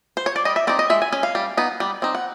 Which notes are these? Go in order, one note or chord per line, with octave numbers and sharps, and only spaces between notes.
C5
C#5
D5
G3 D#5
E5
C4 D#4 D5
D#5
G#3 E5
G#5
C#4 G#5
F5
G3
B3 D#4
G3
C4 D#4
F#5